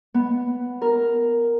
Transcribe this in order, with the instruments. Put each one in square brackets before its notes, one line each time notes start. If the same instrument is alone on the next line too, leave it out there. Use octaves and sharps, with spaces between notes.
[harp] B3
A#4